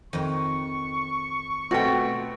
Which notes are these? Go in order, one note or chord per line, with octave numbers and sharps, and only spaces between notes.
F2 D#3 C#6
B2 A3 C4 F#4 G5